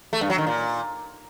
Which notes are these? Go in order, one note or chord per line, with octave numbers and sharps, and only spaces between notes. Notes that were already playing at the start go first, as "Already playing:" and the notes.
A3
G2
F#3
D#3
A#2